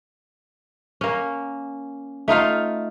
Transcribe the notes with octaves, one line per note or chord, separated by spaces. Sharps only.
A#3 C#4
A3 D#4 F4 F5